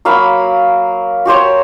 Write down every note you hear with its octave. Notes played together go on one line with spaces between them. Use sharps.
F#3 A#3 F5 B5
F#4 G4 C5 C#5